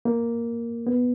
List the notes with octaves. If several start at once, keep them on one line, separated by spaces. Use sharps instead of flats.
A#3
B3